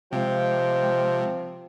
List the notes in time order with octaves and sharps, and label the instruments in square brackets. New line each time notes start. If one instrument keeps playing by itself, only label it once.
[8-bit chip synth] C3 [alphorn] F3 [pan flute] G#3 [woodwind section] F5 G5